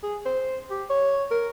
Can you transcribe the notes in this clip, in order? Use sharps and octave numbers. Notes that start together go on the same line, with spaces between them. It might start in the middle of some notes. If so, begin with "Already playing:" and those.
G#4
C5
G4
C#5
A#4